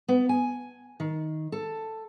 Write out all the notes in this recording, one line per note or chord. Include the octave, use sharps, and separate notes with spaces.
B3
G#5
D#3
A4